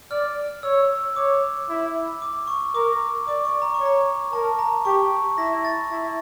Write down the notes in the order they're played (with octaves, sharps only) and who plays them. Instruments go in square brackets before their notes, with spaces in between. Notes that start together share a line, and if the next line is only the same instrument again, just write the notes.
[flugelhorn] D5 [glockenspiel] F6
[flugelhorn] C#5 [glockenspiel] E6
[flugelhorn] C#5 [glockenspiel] D6
[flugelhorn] E4
[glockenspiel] D6
C#6
[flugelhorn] A#4 [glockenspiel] D6
[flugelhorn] D5 [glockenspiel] D6
[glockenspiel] C#6
A#5
C#6
[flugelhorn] C#5
[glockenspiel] A#5
[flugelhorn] A#4 [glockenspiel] A5
[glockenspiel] A#5
[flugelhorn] G4 [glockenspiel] C#6
[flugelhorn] E4 [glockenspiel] A#6
[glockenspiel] A6
[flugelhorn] E4